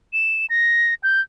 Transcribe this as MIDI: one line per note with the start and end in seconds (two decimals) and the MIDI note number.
0.13 0.46 100
0.50 0.94 94
1.03 1.21 91